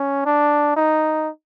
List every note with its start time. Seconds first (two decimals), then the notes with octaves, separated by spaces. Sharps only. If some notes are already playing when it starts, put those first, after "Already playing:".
Already playing: C#4
0.26 D4
0.76 D#4